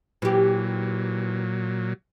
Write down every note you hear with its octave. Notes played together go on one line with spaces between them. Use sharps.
A#2 E3 F#3 G4